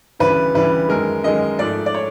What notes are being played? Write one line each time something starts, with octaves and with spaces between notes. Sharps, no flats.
D2 C#3 E3 G3 B4
D2 C#3 E3 G3 B4
F#2 D#3 G#3 A#4
F#2 D#3 G#3 D#5
G#2 F3 A3 D5
D5
C#5